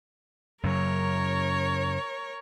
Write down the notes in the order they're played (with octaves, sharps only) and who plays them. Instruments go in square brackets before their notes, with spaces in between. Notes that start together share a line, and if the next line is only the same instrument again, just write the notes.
[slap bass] F#2 C#3 F#3 [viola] A#4 C#5